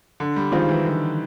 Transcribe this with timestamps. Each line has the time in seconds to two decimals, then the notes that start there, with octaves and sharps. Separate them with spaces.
0.20 D3
0.36 G3
0.52 D#3 F3 G#3 C4 F4
0.68 E3
0.85 D3